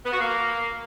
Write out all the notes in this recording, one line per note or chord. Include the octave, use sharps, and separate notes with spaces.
B3
F#4
A#3